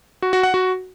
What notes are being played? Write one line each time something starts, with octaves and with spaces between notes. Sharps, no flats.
F#4
F#4
F#5
F#4